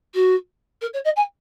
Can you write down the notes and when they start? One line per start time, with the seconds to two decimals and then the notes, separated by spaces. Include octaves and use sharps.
0.14 F#4
0.82 A#4
0.93 C#5
1.05 D#5
1.16 G#5